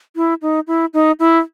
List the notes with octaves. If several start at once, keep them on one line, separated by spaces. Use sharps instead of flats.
E4
D#4
E4
D#4
E4